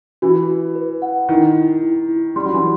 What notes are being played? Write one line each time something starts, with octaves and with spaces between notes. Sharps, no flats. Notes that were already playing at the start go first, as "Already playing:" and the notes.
E3 F#4
F#4
B4
F#5
D#3 E4
E4
E4
E4
G3 C6
F#3
E3